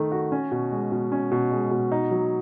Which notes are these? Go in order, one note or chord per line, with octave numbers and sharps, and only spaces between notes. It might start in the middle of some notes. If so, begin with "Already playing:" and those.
Already playing: D#3 A3 D#4
F#4
C#4
B2
G#3
B2
C#4
B2
G#3
B2
D#4
F#3